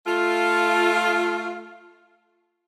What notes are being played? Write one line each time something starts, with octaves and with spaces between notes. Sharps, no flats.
A3 F4